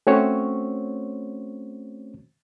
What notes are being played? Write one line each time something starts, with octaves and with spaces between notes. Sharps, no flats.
A3 C4 C#4 F#4 C5 C#5